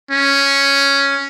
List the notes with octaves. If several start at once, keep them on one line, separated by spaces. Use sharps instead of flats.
C#4